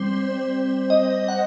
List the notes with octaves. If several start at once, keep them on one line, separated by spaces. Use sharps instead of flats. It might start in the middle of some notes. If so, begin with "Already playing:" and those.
Already playing: G3 C4 C5
D#5
F#5